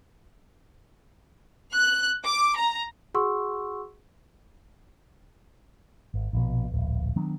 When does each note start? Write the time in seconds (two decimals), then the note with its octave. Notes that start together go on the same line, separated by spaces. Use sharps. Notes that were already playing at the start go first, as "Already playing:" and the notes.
1.75 F#6
2.25 D6
2.57 A#5
3.14 F#4 G#4 F#5 C6 C#6 E6
6.14 G#1
6.33 A#1 B2
6.71 D1 A#1
7.16 D#3 F#3 B3 D4